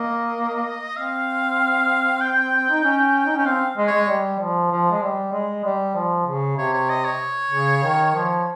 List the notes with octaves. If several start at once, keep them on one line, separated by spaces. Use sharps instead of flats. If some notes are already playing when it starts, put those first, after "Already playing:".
Already playing: A#3 D#5
C4 F5
G5
D#4
C#4
D#4
C#4 G5
C4 F5
G#3
C#5
G#3
G3
F3
F3
G#3
G3
G#3
G3
F3
C#3
C3 C#5
C#5
D#5
C#5
C#3
D#3
F3